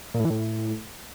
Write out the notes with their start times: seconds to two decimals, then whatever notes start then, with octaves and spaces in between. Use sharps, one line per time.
0.14 A#2
0.20 A2
0.25 E3
0.30 A2